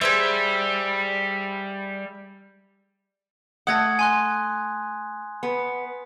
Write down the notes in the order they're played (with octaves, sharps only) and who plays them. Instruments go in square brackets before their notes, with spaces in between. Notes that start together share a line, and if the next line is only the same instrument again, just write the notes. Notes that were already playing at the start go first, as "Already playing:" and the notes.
[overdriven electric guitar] G3 [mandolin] G#4 C5 E5
[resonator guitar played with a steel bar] A3 F#5 [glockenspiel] D#6 G#6 A#6
[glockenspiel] G#5 C6 F#6
[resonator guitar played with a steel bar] B3